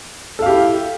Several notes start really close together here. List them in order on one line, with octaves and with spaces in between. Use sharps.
A4 F5 G4 E4